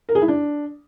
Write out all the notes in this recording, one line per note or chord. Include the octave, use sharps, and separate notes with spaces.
A#4
G#4
E4
D4